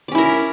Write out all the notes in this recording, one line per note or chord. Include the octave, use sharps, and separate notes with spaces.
C#4 E4 A#4 D5